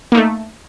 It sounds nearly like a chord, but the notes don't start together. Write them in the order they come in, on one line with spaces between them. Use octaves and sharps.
A#3 D#4 A3